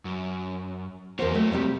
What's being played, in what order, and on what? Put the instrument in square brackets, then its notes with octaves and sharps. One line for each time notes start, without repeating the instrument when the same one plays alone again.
[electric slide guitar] F#2
[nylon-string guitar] E2 A#4 C5 [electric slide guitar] F#3 A#3 F#4
[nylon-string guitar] A3
C3 G3 G4